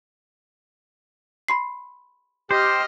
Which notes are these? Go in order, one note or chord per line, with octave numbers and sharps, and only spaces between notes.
B5 C6 C7
G4 C5 D#5 F6